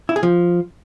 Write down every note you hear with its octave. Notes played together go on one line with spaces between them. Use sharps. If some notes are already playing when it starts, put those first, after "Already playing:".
E4
G#4
F3